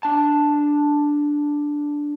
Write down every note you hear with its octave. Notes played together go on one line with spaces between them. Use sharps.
D4 A5